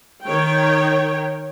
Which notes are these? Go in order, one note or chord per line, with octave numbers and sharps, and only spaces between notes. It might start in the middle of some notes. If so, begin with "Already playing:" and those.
D#3 C#5 G5